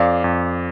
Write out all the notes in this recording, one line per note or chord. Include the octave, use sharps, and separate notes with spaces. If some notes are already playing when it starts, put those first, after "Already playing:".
Already playing: F2 D5 F5
F2